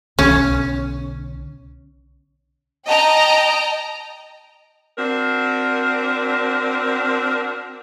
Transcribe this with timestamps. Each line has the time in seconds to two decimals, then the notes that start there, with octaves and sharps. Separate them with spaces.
0.19 B1 D3 C#4
2.86 D#5 G5 A5 A#5
4.98 C4 D4 F#4 A#4